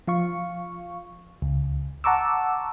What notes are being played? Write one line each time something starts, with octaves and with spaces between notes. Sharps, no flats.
F3 F5 C#6
C#2
F#5 A5 A#5 C#6 D6 E6